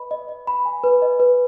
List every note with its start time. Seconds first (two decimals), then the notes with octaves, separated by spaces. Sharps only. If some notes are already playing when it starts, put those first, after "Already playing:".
Already playing: B4 D#5 B5
0.11 D#5
0.29 D#5
0.47 B5
0.65 G#5
0.84 B4
1.02 D#5
1.20 B4